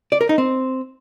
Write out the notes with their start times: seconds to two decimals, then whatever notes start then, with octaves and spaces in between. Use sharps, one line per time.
0.12 D5
0.21 A#4
0.29 D#4
0.38 C4